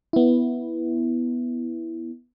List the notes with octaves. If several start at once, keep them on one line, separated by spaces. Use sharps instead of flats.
B3 E4